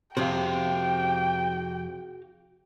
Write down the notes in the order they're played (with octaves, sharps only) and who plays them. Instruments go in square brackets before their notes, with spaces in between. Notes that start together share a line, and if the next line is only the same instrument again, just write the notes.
[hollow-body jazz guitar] F2 C3 [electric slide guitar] F#4 G#4 F5 [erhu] G5